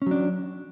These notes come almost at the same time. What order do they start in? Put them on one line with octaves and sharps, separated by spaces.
C#4 F#3 D4